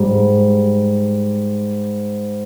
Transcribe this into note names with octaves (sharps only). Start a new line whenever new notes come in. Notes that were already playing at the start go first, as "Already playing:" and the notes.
Already playing: G#2 G3